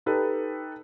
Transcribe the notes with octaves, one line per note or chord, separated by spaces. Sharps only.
D#4 G4 A4 B4